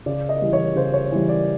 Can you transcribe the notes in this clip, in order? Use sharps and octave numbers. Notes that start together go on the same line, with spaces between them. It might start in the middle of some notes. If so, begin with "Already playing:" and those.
C#3 D5
D#5
E3 G3
C#5
C#3 C5
C#5
E3 G3
D5